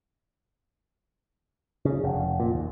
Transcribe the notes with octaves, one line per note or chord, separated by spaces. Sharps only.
C#3
F1
A#2
D#2